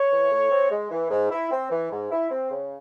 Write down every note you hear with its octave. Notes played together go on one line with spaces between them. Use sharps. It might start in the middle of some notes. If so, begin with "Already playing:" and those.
Already playing: C#5
E3
A2
C4
G#3
E3
G#2
E4
C4
E3
G#2
E4
C4
C#3